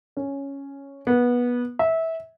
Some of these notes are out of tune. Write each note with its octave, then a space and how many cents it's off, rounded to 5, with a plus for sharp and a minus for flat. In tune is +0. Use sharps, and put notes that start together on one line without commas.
C#4 +0
B3 -20
E5 -20